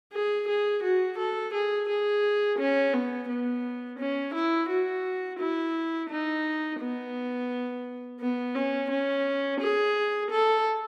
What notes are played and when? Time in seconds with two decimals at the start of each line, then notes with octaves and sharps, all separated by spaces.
0.13 G#4
0.48 G#4
0.83 F#4
1.18 A4
1.53 G#4
1.89 G#4
2.59 C#4
2.93 B3
3.29 B3
3.99 C#4
4.34 E4
4.69 F#4
5.39 E4
6.09 D#4
6.80 B3
8.20 B3
8.55 C#4
8.90 C#4
9.60 G#4
10.31 A4